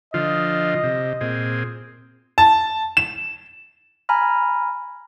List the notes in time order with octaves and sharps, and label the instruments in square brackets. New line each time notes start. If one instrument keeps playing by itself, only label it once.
[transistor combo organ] D3 F3 F4 [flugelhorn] D#5
[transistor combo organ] C3
A#2 C4 G#4
[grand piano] A5
E7
[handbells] G#5 A#5 B5 F6